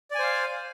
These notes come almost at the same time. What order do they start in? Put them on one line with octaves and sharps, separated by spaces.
D5 G#5 C5 F5